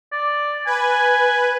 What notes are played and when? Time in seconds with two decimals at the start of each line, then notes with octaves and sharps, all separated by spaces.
0.12 D5
0.66 B4 G#5